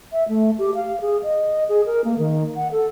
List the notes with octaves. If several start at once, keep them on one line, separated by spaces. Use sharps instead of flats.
E5
A3
G4
F5
G#4
D#5
G#4
A#4
A#3
D#3
F#5
A4